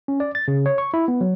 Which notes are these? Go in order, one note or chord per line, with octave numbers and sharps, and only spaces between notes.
C#4
D5
A6
C#3
C#5
C#6
E4
B3
F#3